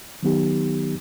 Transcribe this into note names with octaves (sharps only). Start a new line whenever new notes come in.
D#3 F#3 B3 D#4 G4